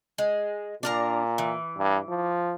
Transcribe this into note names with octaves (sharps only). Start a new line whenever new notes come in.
G#3
A#2 D4 A#4 A#5
E3
G2
F3